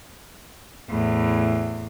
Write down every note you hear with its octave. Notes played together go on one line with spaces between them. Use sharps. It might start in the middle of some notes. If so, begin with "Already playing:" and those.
E2 A2